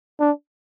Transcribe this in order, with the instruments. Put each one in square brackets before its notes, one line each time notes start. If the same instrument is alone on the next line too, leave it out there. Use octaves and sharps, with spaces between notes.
[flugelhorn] D4